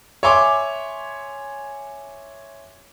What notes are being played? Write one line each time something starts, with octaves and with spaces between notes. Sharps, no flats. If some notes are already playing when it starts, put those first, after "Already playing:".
C#5 E5 G#5 C6 D6